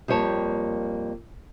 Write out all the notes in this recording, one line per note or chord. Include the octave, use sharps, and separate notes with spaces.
F2 G3 A#3 C#5 A5